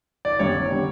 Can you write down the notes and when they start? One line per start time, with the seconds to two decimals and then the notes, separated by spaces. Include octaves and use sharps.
0.25 F#1 D5
0.39 F#2 D3 G3 C#5
0.55 F#1
0.71 D3 G3